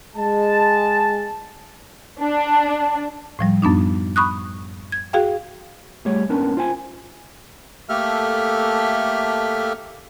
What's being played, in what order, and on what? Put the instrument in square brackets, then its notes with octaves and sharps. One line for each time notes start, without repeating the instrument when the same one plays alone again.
[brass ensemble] G#3 A5
[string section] D4
[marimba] A2 F3 G3
F#2 B3 D4 D#4
B5 C#6 D#6 F#6
G#6
F#4 G#4 F5 G5
[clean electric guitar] G3 A3 G#4 C#5
A#3 B3 C#4 D4 A#4
F4 C5 G5 G#5
[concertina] A3 A#3 G4 A4 E5 F6